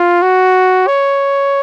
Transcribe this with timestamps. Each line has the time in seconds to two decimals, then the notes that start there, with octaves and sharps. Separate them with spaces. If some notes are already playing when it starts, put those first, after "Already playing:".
Already playing: F4
0.22 F#4
0.87 C#5